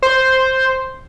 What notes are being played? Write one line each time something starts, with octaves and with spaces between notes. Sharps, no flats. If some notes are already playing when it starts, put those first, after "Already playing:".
C5